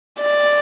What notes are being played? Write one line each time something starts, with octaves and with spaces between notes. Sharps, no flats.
D5